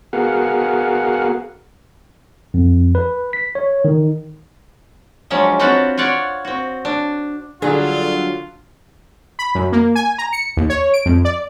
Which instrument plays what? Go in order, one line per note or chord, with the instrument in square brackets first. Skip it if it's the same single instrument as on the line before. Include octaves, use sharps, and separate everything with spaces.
[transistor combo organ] B3 F#4 G#4 A#4 F5 F#5
[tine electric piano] F2
B4
B6
C#5
D#3
[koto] F3 F#3 G#3 C#4 D4
C4 F4 F#4 B4 F#5 A5
F4 C#5 D5 F#5
C4 F#4
D4
[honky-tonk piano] D3 [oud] F#3 G3 G#4 [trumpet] F4 [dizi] D5
[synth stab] B5
F#2
A#3
G#5
A#5
C#7
D#2
C#5
D7
F2
D5